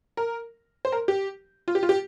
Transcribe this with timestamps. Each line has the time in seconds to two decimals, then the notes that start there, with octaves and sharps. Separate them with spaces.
0.17 A#4
0.85 C5
0.92 A#4
1.08 G4
1.68 F4
1.75 G4
1.83 F4
1.89 G4